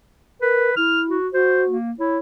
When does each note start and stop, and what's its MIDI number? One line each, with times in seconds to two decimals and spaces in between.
0.41 0.71 70
0.41 0.72 71
0.77 1.18 64
0.77 1.01 89
1.09 1.29 66
1.33 1.76 66
1.33 1.63 72
1.68 1.92 58
2.00 2.19 64
2.00 2.19 73